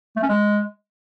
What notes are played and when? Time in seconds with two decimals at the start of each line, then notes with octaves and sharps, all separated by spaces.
0.16 A3
0.23 C#4
0.29 G#3